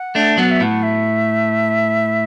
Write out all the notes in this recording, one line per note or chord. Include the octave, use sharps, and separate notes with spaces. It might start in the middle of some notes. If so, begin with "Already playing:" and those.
Already playing: F#5
A3 D4
F#3 B3 F#5
E5
A2 F#5
E5